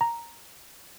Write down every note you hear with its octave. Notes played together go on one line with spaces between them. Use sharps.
A#5